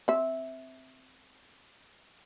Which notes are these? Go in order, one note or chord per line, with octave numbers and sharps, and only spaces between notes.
C4 E5